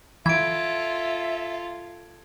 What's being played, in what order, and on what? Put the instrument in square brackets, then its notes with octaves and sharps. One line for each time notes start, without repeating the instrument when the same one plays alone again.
[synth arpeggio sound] E3 [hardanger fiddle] F4 A4 [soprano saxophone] E5 [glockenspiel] G#6 D7